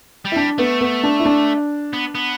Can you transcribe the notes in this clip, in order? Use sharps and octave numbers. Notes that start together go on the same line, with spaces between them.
G3
E4
D4
A3 B3
B3
D4
E4
D4
B3
B3